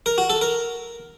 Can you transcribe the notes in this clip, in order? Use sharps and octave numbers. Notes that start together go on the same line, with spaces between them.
A#4
F#4
A4
A#4